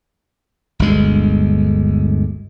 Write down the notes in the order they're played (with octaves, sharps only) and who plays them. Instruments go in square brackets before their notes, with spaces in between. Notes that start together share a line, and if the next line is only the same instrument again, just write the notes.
[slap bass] G1 D2 G#3